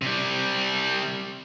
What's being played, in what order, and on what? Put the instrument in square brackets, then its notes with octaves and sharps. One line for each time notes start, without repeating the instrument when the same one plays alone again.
[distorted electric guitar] C3 G3